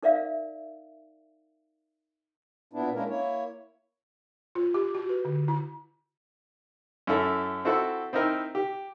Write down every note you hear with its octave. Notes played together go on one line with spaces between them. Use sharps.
D#4 A#4 D5 E5 F5
A#2 B3 D4 E4
G#3 A#3 C#4 D4 E4 A#4
A#3 E4 C#5
F4
G4
F#4
B4
D3
E4
F#2 E4 A4
C4 E4 F#4 A4 F#5
C4 D#4 E4 A#4 G5
G4